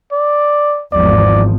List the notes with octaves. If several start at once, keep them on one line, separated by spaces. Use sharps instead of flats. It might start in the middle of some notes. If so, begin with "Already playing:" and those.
D5
G#1 E2 F3 D5